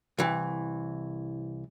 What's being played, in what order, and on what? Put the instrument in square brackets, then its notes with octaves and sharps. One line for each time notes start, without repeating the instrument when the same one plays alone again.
[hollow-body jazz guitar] C2 E3